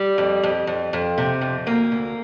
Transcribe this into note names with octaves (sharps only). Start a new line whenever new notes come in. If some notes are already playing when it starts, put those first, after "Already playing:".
Already playing: G3
F2
F2
F2
F2
C3
F2
D2 A#3
D2